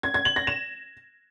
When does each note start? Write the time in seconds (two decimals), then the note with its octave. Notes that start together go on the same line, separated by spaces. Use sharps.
0.03 G#6
0.14 G#6
0.25 F#7
0.36 A#6
0.47 E7